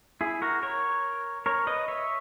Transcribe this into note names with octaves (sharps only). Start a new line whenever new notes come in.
E4 G#4
F#4 A#4
A#4 C#5
A#4 C#5
B4 D#5
C#5 E5